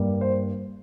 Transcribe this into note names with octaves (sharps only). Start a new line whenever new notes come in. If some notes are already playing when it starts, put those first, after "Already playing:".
Already playing: G2 G3 A#3
C5